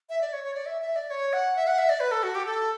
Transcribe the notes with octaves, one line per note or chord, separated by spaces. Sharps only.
E5
D5
C#5
C#5
D5
E5
E5
D5
C#5
F#5
E5
F#5
E5
D5
B4
A4
F#4
G4
A4